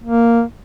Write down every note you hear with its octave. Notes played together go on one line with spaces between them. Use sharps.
A#3